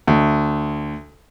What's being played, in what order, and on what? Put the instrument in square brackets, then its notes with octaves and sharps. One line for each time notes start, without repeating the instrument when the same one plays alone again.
[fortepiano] D2